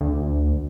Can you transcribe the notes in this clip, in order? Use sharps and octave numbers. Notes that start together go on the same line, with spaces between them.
D2